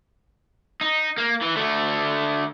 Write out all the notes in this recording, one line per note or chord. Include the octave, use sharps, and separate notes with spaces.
D#4
A#3
E3
D3 A3